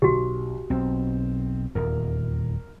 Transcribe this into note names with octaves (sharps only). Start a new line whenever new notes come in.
B1 F#4 G4
B1 C4
D#1 E2 A#4